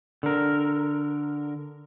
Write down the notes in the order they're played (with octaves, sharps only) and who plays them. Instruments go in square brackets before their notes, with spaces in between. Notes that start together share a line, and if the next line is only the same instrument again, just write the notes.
[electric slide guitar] D3 A#4